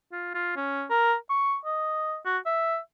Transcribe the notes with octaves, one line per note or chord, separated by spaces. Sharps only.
F4
F4
C#4
A#4
C#6
D#5
F#4
E5